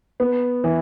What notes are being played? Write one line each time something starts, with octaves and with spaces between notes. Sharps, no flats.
B3
E3